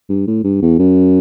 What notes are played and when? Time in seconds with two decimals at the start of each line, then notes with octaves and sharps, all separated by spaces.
0.09 G2
0.27 A2
0.44 G2
0.62 E2
0.79 F#2